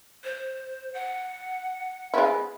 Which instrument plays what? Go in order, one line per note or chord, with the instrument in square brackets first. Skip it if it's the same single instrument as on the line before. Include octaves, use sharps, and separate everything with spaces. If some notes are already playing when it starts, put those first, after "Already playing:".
[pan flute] C5
F#5
[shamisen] G#3 B3 E4